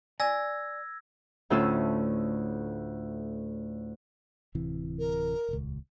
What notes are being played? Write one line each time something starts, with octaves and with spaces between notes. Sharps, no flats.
D5 G#5 E6 G#6 A#6
D2 A2 C#4 F4 E6
D1 C3 E3
A#4
D#1 C#2